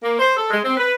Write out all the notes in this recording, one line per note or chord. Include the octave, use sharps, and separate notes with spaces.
A#3
C5
A4
G#3
C4
B4